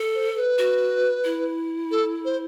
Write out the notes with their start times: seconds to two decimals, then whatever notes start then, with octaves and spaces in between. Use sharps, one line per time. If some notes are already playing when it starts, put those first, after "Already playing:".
Already playing: A4
0.14 C5
0.36 B4
0.58 F#4
1.24 E4
1.91 A4
2.25 C5